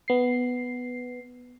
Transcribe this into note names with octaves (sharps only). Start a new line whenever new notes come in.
B3 C7